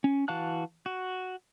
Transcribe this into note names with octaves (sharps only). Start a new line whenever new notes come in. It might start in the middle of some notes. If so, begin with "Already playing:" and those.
C#4
E3 F#4 F5 A5 F#6
F#4